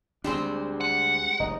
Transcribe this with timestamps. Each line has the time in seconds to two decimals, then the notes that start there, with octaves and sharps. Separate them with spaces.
0.24 D2 G3 G#3 C4 D4
0.81 F#5
1.40 F1 D#4